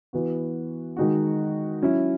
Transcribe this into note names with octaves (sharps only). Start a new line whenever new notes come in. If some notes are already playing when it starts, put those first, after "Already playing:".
E3 B3 F#4
D#3 G#3 D#4 F#4
F#3 C#4 E4